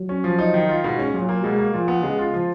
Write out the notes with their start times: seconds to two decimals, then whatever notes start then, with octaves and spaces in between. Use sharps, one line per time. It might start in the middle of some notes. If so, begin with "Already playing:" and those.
Already playing: F#3
0.09 C#4
0.24 F3
0.39 D#4
0.54 D#3
0.69 F4
0.84 G#2 B2
0.99 C#4
1.14 A#2 F#3
1.29 A#3
1.43 B2 G#3
1.58 A#3
1.73 A#2 F3
1.88 B3
2.03 C#3 G#3
2.19 F4
2.34 F3